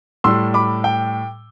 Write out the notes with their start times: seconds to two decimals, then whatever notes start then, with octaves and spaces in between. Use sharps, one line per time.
0.24 A2 G3 C6 E6
0.54 B5 D6
0.84 G5